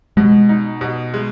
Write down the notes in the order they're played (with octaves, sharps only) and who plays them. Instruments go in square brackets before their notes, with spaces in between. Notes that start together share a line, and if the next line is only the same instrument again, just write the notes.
[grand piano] B2 [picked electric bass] G#3
[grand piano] D#4
B2
G#3